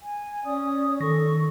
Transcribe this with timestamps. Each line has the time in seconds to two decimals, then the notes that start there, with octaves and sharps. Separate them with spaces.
0.02 G#5
0.44 C#4 D5 D#6
1.00 D#3 A4 C#6 A#6